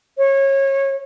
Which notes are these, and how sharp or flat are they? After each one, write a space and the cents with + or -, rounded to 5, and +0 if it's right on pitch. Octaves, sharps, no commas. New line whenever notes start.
C#5 -25